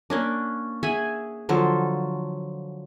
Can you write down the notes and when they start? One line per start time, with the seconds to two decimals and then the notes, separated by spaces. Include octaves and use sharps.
0.10 A#3 C#4 D4
0.83 G#4 E5 F#5 G#5
1.49 D3 F3 F#3 A4